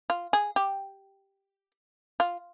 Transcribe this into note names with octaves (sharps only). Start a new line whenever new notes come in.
F4
G#4
G4
F4